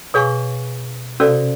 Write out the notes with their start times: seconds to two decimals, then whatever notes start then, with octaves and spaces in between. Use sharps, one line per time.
0.14 B2 G#4 C#5 F5 G#5 C#6
1.20 C3 C#4 F#4 A4 D5 F5